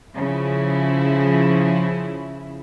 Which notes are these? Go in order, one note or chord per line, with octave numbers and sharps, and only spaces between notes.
C#3 F3 E4